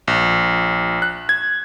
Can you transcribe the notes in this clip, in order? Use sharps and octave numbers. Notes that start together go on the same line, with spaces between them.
A#1
F#6
G#6